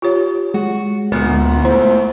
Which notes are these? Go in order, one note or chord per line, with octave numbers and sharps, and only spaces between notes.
F4 G4 C#5
G#3 F#4
D2 A#2 B3
A3 E4 C5